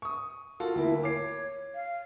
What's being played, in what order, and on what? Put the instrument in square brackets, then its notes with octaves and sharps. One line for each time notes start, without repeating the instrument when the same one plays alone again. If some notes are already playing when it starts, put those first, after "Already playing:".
[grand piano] C#6 D#6
[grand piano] F4 F#4 A4 [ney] A#4
[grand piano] D2 A#3 [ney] E4
[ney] C#5 [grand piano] D6 C7
[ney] F5